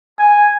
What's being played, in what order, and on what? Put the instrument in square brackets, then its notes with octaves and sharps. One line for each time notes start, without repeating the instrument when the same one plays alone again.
[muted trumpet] G#5